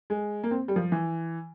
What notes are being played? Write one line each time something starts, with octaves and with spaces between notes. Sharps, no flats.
G#3
A#3
C4
G3
F3
E3